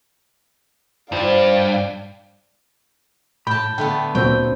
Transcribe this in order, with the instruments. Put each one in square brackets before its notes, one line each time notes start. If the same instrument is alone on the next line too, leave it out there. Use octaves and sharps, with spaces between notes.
[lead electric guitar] G2 [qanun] F3 F4 [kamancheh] D5 F5
[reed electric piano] A2 [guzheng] G5 A5 [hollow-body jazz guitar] B5
[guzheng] D3 A3 B3 [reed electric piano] G5
[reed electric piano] D2 A#2 C5 [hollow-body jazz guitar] F#3 C4 [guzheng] G5